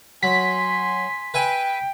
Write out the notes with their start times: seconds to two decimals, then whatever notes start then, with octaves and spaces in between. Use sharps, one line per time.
0.23 F#3 G#5 C6 B6
1.34 B4 E5 G5 G#5